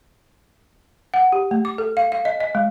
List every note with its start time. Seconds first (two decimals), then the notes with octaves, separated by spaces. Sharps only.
1.14 F#5
1.32 G4
1.51 A3
1.65 D6
1.78 A4
1.97 F5
2.12 F5
2.25 D#5
2.40 D#5
2.55 G#3